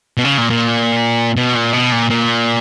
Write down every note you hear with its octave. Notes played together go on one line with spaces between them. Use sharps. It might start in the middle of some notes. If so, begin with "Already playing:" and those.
B2
C#3
A#2
A#2
B2
A#2
B2
A#2
A#2